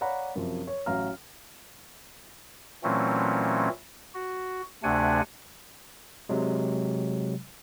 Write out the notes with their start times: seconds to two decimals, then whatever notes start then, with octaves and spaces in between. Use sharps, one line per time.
0.01 C#5 D5 F5 F#5 A#5 B5
0.36 F#2 C3 F3
0.67 C#5
0.86 A1 F#3 C#5 F5 A#5 F6
2.84 A#2 E3 F#3 A3 C4 C#4
4.15 F#4
4.83 D2 C3 A3 D4 F#5 G#5
6.29 C3 F#3 G#3